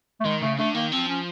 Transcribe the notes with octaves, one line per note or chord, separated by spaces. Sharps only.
A3
D#3 G#3
C#3 A3
D3 A3
D#3 A#3
F3 C4
C#4